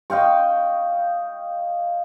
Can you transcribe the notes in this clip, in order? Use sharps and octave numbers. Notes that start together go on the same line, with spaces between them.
D#5 F5 G5 C#6